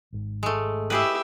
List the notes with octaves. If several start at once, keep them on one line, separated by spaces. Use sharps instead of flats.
G#1 G#2
G#3 A3
E4 G4 G#4 B4 E5